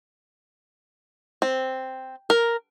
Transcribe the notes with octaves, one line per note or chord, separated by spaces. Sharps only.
C4
A#4